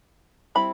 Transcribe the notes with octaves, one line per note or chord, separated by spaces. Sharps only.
G3 C4 E4 B5